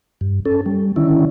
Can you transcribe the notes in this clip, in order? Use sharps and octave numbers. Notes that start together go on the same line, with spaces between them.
G2
C#4 A4
G3
D3 D#3 C#4 E4